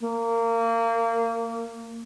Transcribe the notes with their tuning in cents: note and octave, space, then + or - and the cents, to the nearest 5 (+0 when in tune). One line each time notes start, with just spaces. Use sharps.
A#3 -25